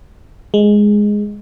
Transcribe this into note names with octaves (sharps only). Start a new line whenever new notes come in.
G#3